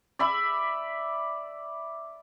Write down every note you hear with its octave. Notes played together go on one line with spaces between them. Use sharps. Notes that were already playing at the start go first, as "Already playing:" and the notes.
D5 E5 B5